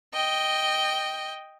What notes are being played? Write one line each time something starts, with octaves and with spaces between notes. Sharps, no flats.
D#5 G5